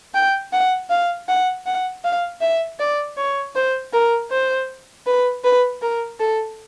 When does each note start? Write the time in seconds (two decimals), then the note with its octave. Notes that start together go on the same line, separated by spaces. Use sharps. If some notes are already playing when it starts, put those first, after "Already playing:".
0.15 G5
0.53 F#5
0.90 F5
1.29 F#5
1.66 F#5
2.04 F5
2.41 E5
2.79 D5
3.17 C#5
3.55 C5
3.93 A#4
4.31 C5
5.07 B4
5.44 B4
5.82 A#4
6.20 A4